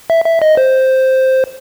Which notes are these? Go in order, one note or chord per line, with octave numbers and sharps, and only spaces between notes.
E5
E5
D#5
C5